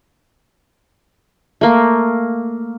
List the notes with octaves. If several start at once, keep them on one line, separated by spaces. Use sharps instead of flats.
A3 A#3